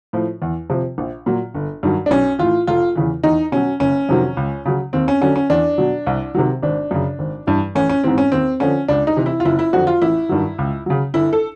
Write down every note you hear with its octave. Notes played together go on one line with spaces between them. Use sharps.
A2 F3
E2
C3 F3
A#1
A#2 F#3
G1
G2 D#3 F#3
D4
B1 C#4
A2 E3 F4
F1 F4
E2 C#3 E3
E2 D#4
B2 F#3 C#4
F#1 C#4
F2 C3 D#3 F#3
C#2
C#3 F#3
D#2 C4
C#4
D3 F#3 C#4
C#4
E2 D4
B2 F#3
C2
C3 D#3 F#3
G#1 D4
F#2 C#3
G#1
G2 E3
A1 C#4
C#4
G#2 E3 C4
C#4
D#2 C4
D3 F3 C#4
C#2 D4
D#4
C3 E3
E4
F4
F#1 E4
E4
F2 D3 F#3 F#4
F4
A1 E4
G2 D#3 F#3
C#2
C#3 F#3
G1 E4
A4